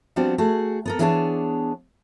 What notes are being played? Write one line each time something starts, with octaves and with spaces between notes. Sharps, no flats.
F3 G3 B3 C4 D4 F#4
A3 F#4 G#4
B3 A4 A#4
E3 B3 D4 G#4 C#5 A5